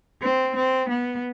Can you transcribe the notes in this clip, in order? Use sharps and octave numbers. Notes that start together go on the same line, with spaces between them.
C4
C4
B3